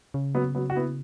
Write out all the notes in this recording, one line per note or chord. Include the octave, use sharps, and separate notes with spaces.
C#3
F#3 B3
F#3 B3
F#4
B3 E4